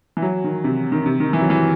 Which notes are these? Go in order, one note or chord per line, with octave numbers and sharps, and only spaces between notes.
E3
F#3
D#3
C3
D#3
C3
D#3
E3
F#3
E3